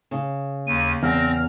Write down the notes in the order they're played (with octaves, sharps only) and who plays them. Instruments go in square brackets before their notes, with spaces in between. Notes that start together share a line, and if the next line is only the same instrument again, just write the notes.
[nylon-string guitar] C#3
[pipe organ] D#2 [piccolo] D#7
[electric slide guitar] E2 [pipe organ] C4 A#6 [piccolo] F6